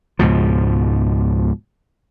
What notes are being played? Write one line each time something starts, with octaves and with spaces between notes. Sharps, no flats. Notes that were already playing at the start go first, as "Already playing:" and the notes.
C#2 G#2 B2 F3